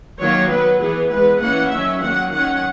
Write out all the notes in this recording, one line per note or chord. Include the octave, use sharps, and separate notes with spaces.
D#3 F#3 A#3 C#5
F#3 B3 B4
E3 B3 G#4
E3 G#3 B3 B4
E3 A#3 C#4 F#5
D#3 F#3 C#4 E5
D#3 F#3 A#3 C#4 F#5
D#3 F#3 C#4 F#5